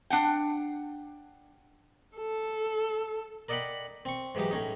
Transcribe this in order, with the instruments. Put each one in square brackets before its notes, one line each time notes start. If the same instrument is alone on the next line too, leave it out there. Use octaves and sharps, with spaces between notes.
[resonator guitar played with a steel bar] D4 F#5 G5
[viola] A4
[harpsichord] A#4 D5 D#5 F#5 G5 B5
C4 C#6
G#2 E3 F#3 D#4 G4
A2 C#4 D#4